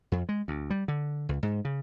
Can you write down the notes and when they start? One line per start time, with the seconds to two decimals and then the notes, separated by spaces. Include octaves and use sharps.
0.12 F2
0.29 G#3
0.48 D2
0.70 G3
0.88 D3
1.29 C#2
1.43 G#2
1.65 C#3